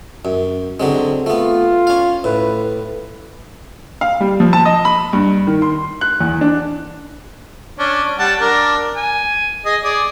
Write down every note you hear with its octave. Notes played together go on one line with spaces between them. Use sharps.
F#2
D3 F#3 G#3 C4
A3 B3 F4
C#4 F5
A2 B4
F5
G3
F3
A5
D#5
B5
G2
D#3
C6
F#6
E2
D4
C#4 D4
G3 F#5 A5
D4 A#4
G#5
G#4 D#5
G#4 D5